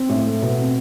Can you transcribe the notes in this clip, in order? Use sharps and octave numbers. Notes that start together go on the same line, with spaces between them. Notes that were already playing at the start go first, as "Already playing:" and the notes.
Already playing: C4
A2
A3
B2
C4